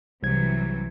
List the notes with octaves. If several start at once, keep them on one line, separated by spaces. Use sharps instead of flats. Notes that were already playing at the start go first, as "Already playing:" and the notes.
C2 C3 E3 F#3 G#6